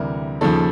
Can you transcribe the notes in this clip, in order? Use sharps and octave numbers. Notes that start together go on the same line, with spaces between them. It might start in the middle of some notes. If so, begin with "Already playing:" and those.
Already playing: D2 C3 E3 G3 A#4
D#2 C#3 F3 A4